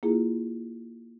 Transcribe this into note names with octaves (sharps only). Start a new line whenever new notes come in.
A#3 E4 F4 G#4